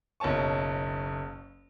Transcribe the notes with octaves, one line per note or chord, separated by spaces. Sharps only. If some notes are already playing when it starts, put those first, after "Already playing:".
F#1 B1 C#5 A5 C#6